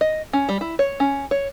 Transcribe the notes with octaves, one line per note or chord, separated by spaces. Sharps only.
D#5
C#4
G3
E4
C#5
C#4
C#5